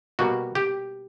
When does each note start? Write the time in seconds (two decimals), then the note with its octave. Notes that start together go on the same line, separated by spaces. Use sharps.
0.19 B2 G3 A#3 F#4
0.55 G4